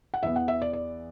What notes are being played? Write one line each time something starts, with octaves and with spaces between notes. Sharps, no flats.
F#5
E2 E3 B3 E5
F#5
E5
D5
D5